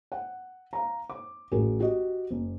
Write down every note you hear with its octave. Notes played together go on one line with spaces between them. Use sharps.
F#5
F5 A#5
D6
A1 F#4 G#4 A#4
F#4 G4 D#5
F#1